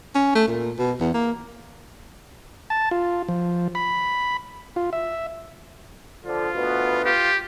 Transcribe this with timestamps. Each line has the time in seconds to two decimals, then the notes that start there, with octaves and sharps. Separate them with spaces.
0.15 C#4
0.35 A3
0.47 A#2
0.79 B2
1.00 E2
1.14 A#3
2.70 A5
2.91 F4
3.28 F3
3.75 B5
4.76 F4
4.93 E5
6.26 D3 F3 F4
6.54 D2 B2 B3
7.05 F4 G4